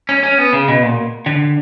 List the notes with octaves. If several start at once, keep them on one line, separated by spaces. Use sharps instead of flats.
C#4
C#4
B3
C#3
B2
A#2
D3